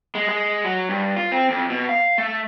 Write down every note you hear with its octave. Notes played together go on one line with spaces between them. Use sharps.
G#3
G#3
F#3
G2
F4
C4
F2
B2
F5
A3